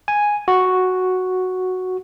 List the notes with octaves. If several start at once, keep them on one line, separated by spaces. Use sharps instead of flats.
G#5
F#4